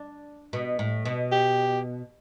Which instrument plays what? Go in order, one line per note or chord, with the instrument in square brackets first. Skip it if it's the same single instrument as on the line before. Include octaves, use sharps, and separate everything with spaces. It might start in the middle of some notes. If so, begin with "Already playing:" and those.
Already playing: [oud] D4
B2
A2
B2
[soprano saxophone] G4